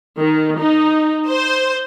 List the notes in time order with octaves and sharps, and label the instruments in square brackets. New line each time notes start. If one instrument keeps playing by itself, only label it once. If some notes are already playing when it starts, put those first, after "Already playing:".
[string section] D#3
D#4
C5